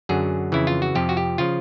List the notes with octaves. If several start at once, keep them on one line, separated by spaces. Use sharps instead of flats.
F#2 D3 F#3 G#4
F2 C#3 E3 E4
F4
F#4
F2 C3 F3 G4
F#4
G4
C#3 F3 F4